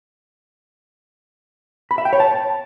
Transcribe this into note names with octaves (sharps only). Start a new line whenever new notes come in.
B5
E5
G5
C#5
A5